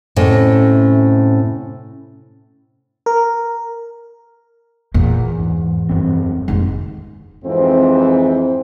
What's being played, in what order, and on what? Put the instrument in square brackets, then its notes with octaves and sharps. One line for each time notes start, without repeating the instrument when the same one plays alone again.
[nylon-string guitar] A2 C3 C#4 D#5
[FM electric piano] A#4
[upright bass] E2 [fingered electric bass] A#2 A#3
[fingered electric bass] G#2
F1 G2 C4
[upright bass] F1 A#1 [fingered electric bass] D#2 G#2
[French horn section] F2 G#2 E3 C4